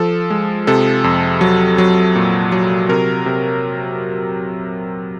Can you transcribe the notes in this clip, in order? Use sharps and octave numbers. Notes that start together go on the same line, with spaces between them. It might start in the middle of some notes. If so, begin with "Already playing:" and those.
Already playing: F3 A4
G#3
C3 A4
F2
F#3
F#3
A#2
F#3
C3 A#4
C3